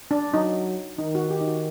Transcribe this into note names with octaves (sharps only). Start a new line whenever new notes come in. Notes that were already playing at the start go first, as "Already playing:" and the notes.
D4
F#3 D#4
D#3 D#4
F#4
G4
D#4
F#4